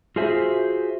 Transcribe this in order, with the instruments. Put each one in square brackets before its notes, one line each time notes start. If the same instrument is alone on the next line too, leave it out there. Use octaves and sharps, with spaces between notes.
[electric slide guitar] F4 F#4 G#4 C5 E5